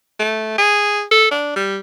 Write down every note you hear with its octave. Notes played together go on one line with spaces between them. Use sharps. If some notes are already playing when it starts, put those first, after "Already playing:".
A3
G#4
A4
D4
G3